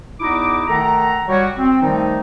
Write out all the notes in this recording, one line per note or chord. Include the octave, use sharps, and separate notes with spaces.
E2 D#4 E4 F#4 D6
D#3 A3 A4 F#5 A#5
G3 F#4 C#5
C4
D#3 F3 G3 A3 D#4